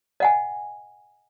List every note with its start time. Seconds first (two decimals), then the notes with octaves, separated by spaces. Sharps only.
0.20 D#5 F#5 G#5